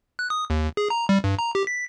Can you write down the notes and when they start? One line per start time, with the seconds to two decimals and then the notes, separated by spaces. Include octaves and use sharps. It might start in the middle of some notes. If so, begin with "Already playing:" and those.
0.19 F#6
0.30 D#6
0.50 D#2
0.77 G#4
0.90 A#5
1.09 G3
1.24 G2
1.39 A#5
1.55 G4
1.67 B6